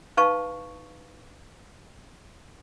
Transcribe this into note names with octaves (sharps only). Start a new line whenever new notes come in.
D#4 B4 F5 A5 C#6